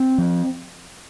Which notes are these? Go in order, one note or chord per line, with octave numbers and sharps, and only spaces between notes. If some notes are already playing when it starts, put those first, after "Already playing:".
Already playing: C4
F3